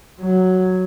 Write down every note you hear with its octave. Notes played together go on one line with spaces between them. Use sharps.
F#3